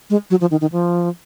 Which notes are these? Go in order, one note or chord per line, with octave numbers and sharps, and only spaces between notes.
G#3
F#3
F3
D#3
D#3
F3